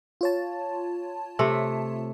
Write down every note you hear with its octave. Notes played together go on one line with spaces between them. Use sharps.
F4 C#5 A5
C3 A3